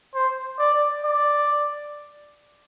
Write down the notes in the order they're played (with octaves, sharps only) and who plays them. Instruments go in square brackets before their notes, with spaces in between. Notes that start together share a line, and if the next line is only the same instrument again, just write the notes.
[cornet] C5
D5
D5